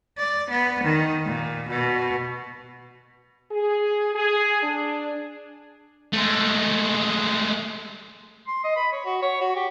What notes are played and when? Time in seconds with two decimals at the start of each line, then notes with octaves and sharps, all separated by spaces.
0.18 D5
0.51 B3
0.84 D#3
1.26 A#2
1.69 B2
3.52 G#4
4.14 G#4
4.63 D4
6.13 G#3 A3
8.47 C6
8.64 D#5
8.76 B5
8.92 C#5
9.05 F#4
9.22 C#5
9.41 F#4
9.56 G4